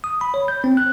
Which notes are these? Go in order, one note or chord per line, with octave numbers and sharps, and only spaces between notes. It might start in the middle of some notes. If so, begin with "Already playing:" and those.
D#6
B5
C#5
G6
C4
F#6